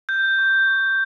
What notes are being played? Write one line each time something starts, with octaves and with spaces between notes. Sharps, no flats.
F6 G6
C#6
C#6